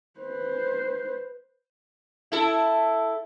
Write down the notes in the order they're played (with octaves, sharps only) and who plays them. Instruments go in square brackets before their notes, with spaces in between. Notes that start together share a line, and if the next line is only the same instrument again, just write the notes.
[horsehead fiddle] B4 C5
[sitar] E4 A4